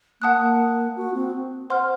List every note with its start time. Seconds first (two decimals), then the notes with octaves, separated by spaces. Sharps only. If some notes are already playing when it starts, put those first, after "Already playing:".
0.21 A#3 F#5 A5 D#6 F#6
0.97 F#4
1.14 C4
1.70 C5 F#5 C6 F6